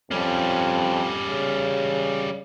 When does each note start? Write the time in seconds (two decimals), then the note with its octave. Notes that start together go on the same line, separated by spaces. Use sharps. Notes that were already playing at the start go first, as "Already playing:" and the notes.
0.11 F2 G3 C#4
1.28 C#3